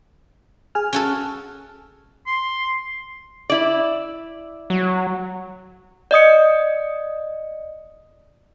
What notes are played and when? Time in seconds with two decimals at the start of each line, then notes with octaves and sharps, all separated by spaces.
0.75 G#4 G#5 F6
0.93 C#4 F#4 A4
2.27 C6
3.50 E4 D5
4.70 F#3
6.11 D5 D#5 D#6 C#7